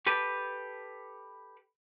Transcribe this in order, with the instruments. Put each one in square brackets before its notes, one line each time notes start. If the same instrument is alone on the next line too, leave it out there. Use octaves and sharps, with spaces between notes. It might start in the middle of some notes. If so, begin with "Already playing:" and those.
[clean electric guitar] G4 A4 B4